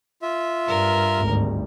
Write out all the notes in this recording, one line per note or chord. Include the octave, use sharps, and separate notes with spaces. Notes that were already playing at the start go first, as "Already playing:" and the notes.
F4 E5
G2 A#4
G#1 D2 G3